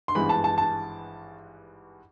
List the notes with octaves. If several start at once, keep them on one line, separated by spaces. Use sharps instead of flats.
C6
G#1 G2 E3 G#3 B3 B5
A5
A5
A5